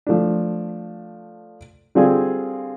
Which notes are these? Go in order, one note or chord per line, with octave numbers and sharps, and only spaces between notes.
F3 A3 D4
D3 G3 C4 F4 G#4